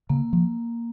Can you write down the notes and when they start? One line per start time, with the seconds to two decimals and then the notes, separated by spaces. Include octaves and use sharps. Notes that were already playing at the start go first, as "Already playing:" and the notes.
0.09 C#3 A#3
0.33 F3